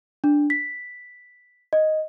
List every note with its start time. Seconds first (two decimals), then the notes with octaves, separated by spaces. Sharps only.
0.24 D4
0.50 B6
1.73 D#5